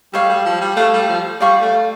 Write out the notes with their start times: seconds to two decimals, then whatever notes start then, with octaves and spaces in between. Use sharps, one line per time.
0.13 G3 A4 C#5 F5
0.29 G3
0.45 F3
0.61 G3
0.76 A3 A4 C#5 F5
0.93 G3
1.09 F3
1.41 G3 D5 F5 C#6
1.61 A3